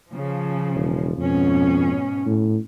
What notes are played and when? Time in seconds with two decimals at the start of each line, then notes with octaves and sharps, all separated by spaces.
0.10 C#3 F3
0.75 E1
1.17 F2 G#2 B2 C#4
2.26 A2